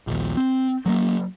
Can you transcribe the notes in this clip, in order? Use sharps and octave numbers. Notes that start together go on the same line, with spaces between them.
A#1 D#2
C4
F#3 G#3 A#3